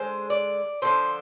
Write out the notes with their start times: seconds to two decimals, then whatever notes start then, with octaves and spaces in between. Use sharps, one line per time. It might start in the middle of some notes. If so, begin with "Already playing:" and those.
Already playing: D3 G#3 C5
0.30 D5
0.82 D3 F3 C4 C5